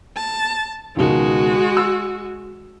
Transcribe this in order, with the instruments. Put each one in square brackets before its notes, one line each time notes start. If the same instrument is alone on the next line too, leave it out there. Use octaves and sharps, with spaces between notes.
[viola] A5
[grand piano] C#2 B2 D#3 [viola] G#3 F#4
[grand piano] E6